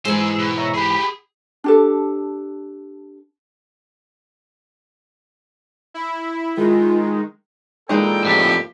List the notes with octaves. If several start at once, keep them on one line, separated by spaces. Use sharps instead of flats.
G#2 E3 G#3 G#4 C5 E6
B2
C#5 E5 A#5
G4 G#4 B5
D4 G4 A4
E4
D#3 G#3 F4
A#2 D#3 E3 G#3 D#4 A4 G5
F2 A2 G4